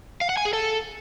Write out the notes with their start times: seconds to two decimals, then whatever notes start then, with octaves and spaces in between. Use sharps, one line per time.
0.21 F5
0.29 F#5
0.37 G#5
0.45 G#4
0.53 A4